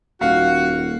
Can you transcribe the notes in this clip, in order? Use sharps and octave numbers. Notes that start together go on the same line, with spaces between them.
D#1 F#4 F5